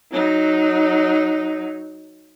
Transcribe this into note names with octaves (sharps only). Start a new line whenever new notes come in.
F#3 D#4